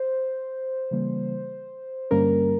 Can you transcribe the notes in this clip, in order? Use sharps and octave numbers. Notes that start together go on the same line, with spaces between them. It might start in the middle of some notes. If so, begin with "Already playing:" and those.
Already playing: C5
C#3 E3 G3 A#3
G2 D3 G3 A#3 C#4 A#4